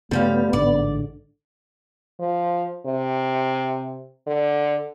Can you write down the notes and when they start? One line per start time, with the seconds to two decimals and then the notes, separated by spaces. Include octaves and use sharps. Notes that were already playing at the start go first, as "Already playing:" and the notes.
0.11 G2 C#3 F3 G3 A3 B3 F5
0.53 A1 G#2 D3 D5
2.20 F3
2.86 C3
4.27 D3